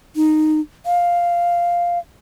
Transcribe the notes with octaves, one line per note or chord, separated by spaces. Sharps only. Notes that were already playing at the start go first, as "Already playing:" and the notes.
D#4
F5